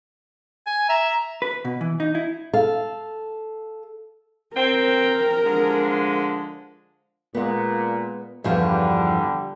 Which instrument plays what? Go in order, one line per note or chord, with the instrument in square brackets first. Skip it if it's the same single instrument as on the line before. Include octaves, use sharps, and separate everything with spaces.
[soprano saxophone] G#5
[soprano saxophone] E5 [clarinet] A#5
[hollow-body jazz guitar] B4
B2
E3
D#4
E4
[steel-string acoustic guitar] A4 F5
[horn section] C4 G5 [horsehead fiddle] A#4
[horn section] D3 F3 G#3
[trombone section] A#2 [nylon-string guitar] G#3 B3
[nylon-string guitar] E2 G2 F3 [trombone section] D3 G3